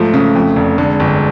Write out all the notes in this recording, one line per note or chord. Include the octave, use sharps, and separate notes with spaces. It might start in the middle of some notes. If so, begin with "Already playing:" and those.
Already playing: G#2 F3 A3
C#3
F2
F1
D3 G#3
G1